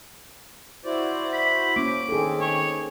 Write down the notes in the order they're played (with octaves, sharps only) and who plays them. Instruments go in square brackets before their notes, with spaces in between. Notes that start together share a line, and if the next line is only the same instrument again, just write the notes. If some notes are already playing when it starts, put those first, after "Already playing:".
[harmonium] E4 F#4 C5 [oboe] D5
[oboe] B5
[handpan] A#3 C#4 [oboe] D6
[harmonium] D#3 C4 [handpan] G#4 A4
[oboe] C#5